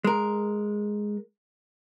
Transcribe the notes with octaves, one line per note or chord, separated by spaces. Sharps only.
G#3 A#4